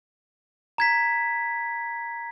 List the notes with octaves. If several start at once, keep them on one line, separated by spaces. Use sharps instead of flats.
A#5 G#6 B6